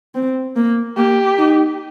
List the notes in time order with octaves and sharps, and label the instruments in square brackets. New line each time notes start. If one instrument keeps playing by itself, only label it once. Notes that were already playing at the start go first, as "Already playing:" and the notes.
[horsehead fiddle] C4
A#3
[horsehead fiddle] A#3 [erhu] G4
[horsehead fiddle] D#4